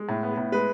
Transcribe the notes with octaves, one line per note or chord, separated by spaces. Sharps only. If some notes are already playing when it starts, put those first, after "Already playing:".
Already playing: G#3
A2
B3
A2
G#3 B4